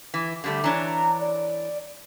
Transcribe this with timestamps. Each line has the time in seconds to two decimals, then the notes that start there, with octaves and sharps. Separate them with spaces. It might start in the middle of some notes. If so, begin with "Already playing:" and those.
0.14 E3
0.44 D3 G3 A3
0.64 E3 D4 C#5 A#5
1.20 D5